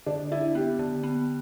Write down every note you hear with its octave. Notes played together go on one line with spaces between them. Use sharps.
D3 D4
D4 E4
B3 G4
D3
B3